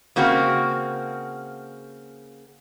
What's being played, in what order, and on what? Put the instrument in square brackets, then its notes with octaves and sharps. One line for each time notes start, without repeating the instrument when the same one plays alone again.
[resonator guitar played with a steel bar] C#3 A#3 C4 F#4